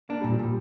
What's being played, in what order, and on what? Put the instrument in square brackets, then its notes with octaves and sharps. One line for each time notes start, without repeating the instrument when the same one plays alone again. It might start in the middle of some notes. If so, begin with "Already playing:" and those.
[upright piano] A#3 [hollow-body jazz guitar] D4
[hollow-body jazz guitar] A#2 [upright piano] G3
[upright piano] F3
[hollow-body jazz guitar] A#2 [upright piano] G3